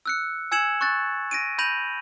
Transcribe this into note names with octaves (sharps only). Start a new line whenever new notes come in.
E6 F#6 C#7
G#5 E6 G#6 C#7 E7 F#7
C#6 F#6 A6
A#6 D7 D#7
B5 G6 A#6 D#7 F7 F#7